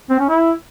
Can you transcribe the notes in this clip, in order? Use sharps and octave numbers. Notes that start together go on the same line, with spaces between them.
C4
C#4
E4